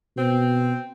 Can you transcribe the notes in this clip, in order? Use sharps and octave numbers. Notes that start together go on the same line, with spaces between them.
B2 C4